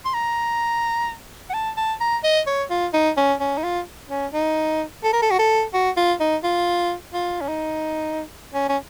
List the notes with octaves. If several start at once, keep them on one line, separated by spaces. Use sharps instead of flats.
C6
A#5
F#5
A5
A5
A#5
D#5
C#5
F4
D#4
C#4
C#4
D#4
F4
C#4
D#4
A4
A#4
A4
F#4
A4
F#4
F4
D#4
F4
F4
C#4
D#4
C#4
C#4